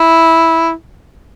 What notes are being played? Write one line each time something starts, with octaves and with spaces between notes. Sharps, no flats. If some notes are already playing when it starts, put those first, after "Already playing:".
Already playing: E4